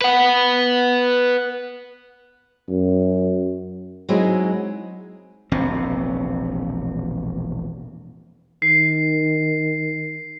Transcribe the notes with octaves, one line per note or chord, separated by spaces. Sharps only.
B4 F#5
F#2
F#3 G#3 C4 D#4 E4 G#4
E1 A#1 C3 C4
D#3 C7